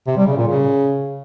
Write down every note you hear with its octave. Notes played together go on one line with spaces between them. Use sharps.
C3
G3
C#3
A#2
C#3